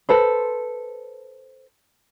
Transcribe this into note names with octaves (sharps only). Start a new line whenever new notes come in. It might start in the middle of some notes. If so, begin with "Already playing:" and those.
A4 B4 C5